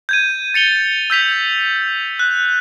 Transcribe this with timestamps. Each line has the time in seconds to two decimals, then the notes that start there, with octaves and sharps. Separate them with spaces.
0.09 G6 G#6 D#7
0.54 A6 C#7 F7 G7
1.10 E6 G6 B6 F7
2.19 F#6